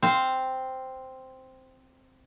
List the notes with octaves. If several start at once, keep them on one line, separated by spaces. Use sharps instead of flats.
C4 C5 F5